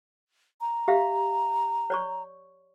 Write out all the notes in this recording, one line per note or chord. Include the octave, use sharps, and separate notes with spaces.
A#5
G4 E5 F5
C#5 D5 C#6